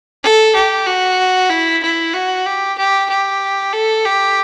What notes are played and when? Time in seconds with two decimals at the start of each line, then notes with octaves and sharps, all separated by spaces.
0.23 A4
0.55 G4
0.86 F#4
1.50 E4
1.82 E4
2.14 F#4
2.46 G4
2.77 G4
3.09 G4
3.73 A4
4.05 G4